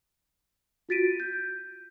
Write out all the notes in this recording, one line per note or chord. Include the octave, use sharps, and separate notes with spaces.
F4 F#4 A6 B6 D7 D#7
G6